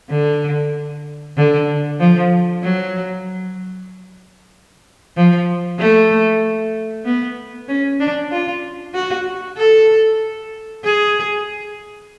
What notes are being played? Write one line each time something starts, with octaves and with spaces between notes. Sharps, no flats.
D3
D3
F3
F#3
F3
A3
B3
C#4
D4
F4
F#4
A4
G#4